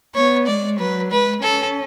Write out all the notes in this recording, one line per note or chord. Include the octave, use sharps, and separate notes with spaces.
B3 C#5
G#3 D5
F#3 B4
G#3 B4
C#4 A4